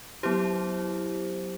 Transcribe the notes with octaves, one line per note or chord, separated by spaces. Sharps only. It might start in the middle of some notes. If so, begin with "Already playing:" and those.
F#3 B3 E4 G4 C5